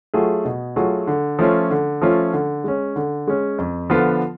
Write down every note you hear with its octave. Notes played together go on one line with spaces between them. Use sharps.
F#3 A3 F4 G#4
B2
F#3 A3 F4 G#4
D3
F3 A3 C#4 F4
D3
F3 A3 C#4 F4
D3
G#3 C#4
D3
G#3 C#4
F2
D3 F3 B3 F4